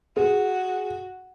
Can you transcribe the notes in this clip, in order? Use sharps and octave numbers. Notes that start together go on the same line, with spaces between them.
F#4 G#4